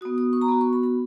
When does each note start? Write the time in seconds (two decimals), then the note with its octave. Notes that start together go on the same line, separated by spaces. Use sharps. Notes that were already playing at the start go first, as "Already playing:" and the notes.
0.01 B3 F#4 D#6
0.18 D#6
0.33 C#6
0.41 A#5
0.48 B3 F#4 B5
0.61 C#6
0.73 B5
0.83 B5